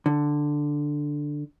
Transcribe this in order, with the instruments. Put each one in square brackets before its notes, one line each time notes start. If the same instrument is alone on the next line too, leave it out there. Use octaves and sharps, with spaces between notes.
[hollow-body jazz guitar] D3